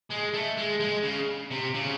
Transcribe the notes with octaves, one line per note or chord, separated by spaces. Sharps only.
G#3
A3
G#3
G#3
C#3
C3
C#3